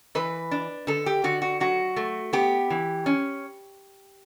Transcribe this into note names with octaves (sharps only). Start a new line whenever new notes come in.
E3 B4
D4
D3 A4
G4
D3 F#4
F#4
F#3 F#4
A3
B3 G4
E3
C#4